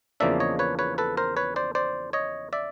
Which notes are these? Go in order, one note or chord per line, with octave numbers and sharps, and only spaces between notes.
E2 C#3 F3 A#3 D4 D5 E5
C#5 D#5
B4 C#5
B4 C#5
A4 B4
A#4 C5
B4 C#5
C5 D5
C5 D5
C#5 D#5
D5 E5